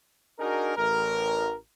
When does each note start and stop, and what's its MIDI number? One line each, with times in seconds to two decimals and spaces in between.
0.39 0.76 62
0.39 0.76 63
0.39 0.76 66
0.39 0.76 68
0.39 0.76 70
0.77 1.55 33
0.77 1.55 70